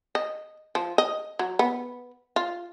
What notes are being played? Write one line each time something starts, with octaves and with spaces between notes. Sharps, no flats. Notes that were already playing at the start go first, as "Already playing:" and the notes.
D#5
F3
D#5
F#3
B3
F4